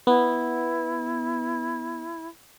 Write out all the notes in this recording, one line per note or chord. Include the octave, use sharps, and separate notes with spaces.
B3 E4